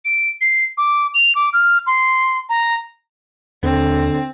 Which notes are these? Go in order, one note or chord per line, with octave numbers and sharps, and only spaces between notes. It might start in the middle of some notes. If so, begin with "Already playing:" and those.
D7
C7
D6
F7
D6
F6
C6
A#5
D#2 D3 C4